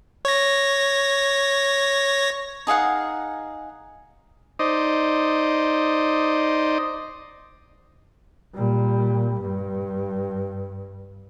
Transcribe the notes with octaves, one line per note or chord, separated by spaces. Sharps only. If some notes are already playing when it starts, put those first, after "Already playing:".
C#5 A#6
D#4 G#4 F5 F#5
D#4 C5 D5 D#5
A#2 G3
G2